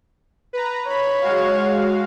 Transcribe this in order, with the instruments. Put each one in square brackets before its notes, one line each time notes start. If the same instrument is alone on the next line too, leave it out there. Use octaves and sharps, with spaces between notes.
[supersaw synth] B4 A#5
[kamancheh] C#5 [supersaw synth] B5
[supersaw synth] G#3 F#4 F5